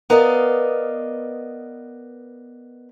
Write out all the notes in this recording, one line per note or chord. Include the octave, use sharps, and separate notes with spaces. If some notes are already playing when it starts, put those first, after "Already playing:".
B3 A#4 D5 D#5 F5